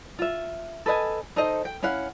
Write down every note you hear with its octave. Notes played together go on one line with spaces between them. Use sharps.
F4 E5
A4 B4 D#5 G#5
D#4 A4 C5 D#5
G5
C#4 E4 F5 F#5